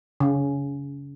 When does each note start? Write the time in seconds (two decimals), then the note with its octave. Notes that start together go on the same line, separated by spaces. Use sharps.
0.20 C#3